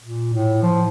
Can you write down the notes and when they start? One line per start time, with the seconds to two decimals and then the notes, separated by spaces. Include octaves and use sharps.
0.03 A#2
0.34 A2
0.63 F3